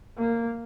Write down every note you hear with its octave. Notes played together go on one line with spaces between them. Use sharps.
A#3